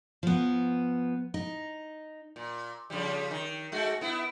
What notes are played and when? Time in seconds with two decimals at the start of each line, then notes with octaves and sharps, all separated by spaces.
0.23 F3 B3
1.34 D#4
2.36 A#2
2.90 C#3 F3 G3
3.31 D#3
3.72 G#3 A3 F#4
4.01 B3 E4